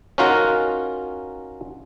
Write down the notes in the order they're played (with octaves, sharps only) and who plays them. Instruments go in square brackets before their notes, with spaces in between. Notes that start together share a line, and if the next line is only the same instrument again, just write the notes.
[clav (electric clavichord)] C#4 D#4 F4 F#4 A#4